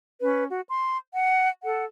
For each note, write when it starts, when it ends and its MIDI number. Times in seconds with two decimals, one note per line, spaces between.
0.22 0.45 61
0.22 0.45 71
0.49 0.62 66
0.69 0.97 84
1.13 1.49 78
1.64 1.85 69
1.64 1.85 78